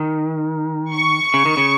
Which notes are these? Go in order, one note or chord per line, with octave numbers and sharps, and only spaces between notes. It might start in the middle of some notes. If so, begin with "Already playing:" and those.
Already playing: D#3
C#6
C#3
D#3
C#3